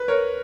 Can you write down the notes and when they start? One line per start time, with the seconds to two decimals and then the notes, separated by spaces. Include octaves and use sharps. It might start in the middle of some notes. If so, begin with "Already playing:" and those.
Already playing: B4
0.08 A#4 C#5